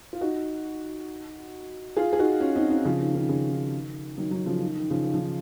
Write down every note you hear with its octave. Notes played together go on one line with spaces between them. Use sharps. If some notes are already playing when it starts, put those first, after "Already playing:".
F4
D#4 F#4
F4 G#4
G#4
D#4 F#4
C#4 F4
C4 D#4
C4 D#4
C#3 F3
D#3
D#3
C#3
D#3
D#3 F#3
D#3 F#3
C#3 F3
D#3
D#3
C#3 F3
D#3
F3
D#3